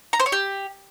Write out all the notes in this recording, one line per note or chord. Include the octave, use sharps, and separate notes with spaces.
A#5
C5
C#5
G4